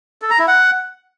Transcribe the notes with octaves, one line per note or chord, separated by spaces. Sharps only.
A4
A#5
E4
F#5